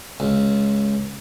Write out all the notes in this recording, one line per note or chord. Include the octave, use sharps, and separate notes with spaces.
C#2